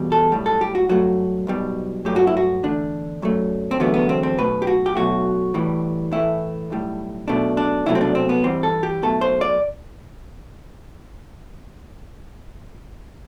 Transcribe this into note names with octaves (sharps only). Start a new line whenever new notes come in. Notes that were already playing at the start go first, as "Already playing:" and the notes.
Already playing: E2 B2 G3
A4
B1 A2 G3
A4
G4
F#4
G2 F#3 A3 F#4
B1 B2 G3
G2 F#3 A3 G4
F#4
E4
F#4
E2 D3 A3 D4
F#2 F#3 A3
C4
E2 D3 F#3 A3 B3
B3
C4
C4
B1 B2 A3 B4
G4
F#4
G4
B1 B2 F#3 A3 F#4
A2 E3 G3
A2 E3 A3 E4
B1 A2 G3
B1 B2 A3 D4
D4
C2 B2 F#3 A3 E4
C4
D4
C4
B3
G2 E3 G3 C4
A4
G4
B1 B2 A3 A4
C5
D5